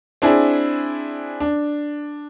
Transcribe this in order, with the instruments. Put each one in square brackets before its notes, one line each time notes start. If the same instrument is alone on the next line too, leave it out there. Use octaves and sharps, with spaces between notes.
[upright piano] C4 D4 E4 G#4
D4